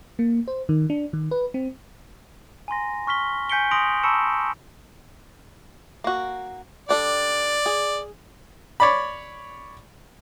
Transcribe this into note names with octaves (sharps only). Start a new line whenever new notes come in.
A#3
C5
D#3
D4
D#3
B4
C4
G#5 A#5 C6 A#6
C#6 F6 B6 G7
G#5 G6 B6 C#7 D7 G7
C6 D#6 A#6 D7 F7 F#7
A5 B5 C#6 E6 C#7 E7
A#3 F#4
G3 D4 A4 D5
G#4
C#5 D5 B5